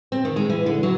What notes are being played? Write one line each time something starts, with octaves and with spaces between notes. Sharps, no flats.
C4
D#3
G#3
E3
D3
F#3